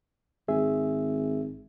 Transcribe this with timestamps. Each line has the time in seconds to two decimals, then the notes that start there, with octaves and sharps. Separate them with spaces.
0.48 G#1 G#4 E5